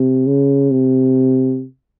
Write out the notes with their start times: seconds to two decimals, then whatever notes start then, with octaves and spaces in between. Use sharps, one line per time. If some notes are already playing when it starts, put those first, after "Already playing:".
Already playing: C3
0.27 C#3
0.71 C3